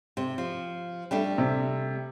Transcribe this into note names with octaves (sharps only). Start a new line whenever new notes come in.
C3
F3
G3 A3 D4
C3